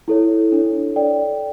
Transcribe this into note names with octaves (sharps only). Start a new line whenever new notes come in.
E4 A4 C#5
D4 A4 C#5
A4 D5 G5